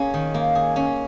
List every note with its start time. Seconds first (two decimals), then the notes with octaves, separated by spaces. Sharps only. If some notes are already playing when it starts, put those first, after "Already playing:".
Already playing: A#3 C#4 G#4
0.14 D#3
0.34 A#3
0.55 G#4
0.76 C#4